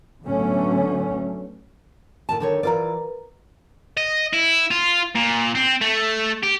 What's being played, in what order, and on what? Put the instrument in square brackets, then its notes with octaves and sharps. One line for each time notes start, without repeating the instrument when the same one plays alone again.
[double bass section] D3 F#3 A3 B3 C#4
[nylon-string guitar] A2 D#3 A5
D3 D#3 C#5
[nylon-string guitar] E3 F4 D5 [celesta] A#4 B4 A#5
[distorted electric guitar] D#5
E4
F4
A#2
C4
A3
G4